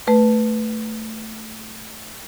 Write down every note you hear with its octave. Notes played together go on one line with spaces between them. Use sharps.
A3 B4